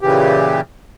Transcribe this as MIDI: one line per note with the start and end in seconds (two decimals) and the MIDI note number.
0.01 0.61 46
0.01 0.61 49
0.01 0.61 52
0.01 0.61 67